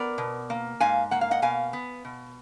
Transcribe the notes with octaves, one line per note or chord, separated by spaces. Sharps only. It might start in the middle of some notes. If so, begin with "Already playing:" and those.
Already playing: B3 A#4 D5
B2
A#3
G#2 F5 G#5
A#3 F#5
F5
D#5 F#5
B2 F5 G#5
B3
B2